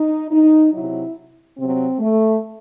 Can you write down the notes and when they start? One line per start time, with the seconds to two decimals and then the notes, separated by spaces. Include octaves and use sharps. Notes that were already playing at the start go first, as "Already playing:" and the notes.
Already playing: D#4
0.31 D#4
0.73 C3 F#3 E4
1.57 C3 F#3 C4
2.00 A3